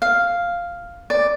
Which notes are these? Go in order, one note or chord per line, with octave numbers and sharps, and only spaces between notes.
F5
D5